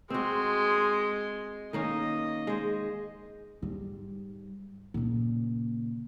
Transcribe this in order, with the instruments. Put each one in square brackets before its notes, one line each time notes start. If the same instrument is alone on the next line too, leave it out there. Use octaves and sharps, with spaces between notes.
[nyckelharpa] G#3 C6 [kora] C4 F#4
[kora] D#3 A#3 C#4 [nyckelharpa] D#5
[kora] G#3 C5
[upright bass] G#2 G3
A#2 C#3